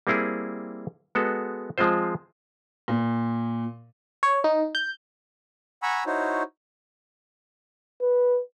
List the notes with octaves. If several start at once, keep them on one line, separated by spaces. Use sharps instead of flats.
G3 A#3 C4 E4 G#4
G#3 B3 F#4 A4
F3 G#3 C4 F4 C5
A#2
C#5
D#4
G6
F#5 G#5 A#5 B5 C#6 E6
D#4 E4 F#4 C5 C#5
B4